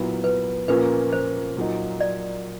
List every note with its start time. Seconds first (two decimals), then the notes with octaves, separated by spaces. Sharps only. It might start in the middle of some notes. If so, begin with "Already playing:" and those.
Already playing: A#2 F#3 B3 E4
0.24 B4
0.68 A#2 F3 A#3 C#4 B4
1.13 C5
1.56 A#2 F#3 A#3 D#4
2.00 D5